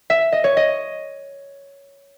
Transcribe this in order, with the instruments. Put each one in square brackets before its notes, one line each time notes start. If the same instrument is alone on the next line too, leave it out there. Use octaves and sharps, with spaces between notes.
[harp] E5
D#5
C#5
D#5